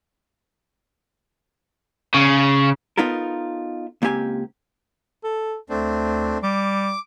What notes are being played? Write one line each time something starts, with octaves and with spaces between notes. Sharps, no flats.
C#3
B3 D#4 F4 A4 A#4
C#2 A#3 C4 G4 G#5
A4
D2 A3 C4 D4
G3 D6